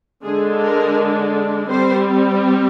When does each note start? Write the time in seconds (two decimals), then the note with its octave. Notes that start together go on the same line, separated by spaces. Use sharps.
0.24 D3 G#3 D4 G#4
0.61 A#4
1.70 G3 C4 C5